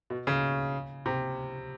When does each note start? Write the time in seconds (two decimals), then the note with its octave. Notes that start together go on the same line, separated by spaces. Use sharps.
0.10 B2
0.27 C#3
1.06 C3